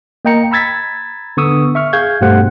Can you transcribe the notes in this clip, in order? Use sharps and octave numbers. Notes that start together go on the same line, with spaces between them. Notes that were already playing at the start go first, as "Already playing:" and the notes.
A#3 D#5 G5 A#5 C#7
A#5 B5 E6 G#6 A6 B6
D3 B3 C#6 D#6 E6
E5 C#6 F6
G#4 F5 G6 G#6
G2 B2 A3 G4 C5 F#5